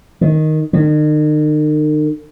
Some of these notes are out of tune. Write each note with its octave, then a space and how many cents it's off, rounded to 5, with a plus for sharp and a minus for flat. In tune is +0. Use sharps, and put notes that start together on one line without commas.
D#3 +0
D#3 -40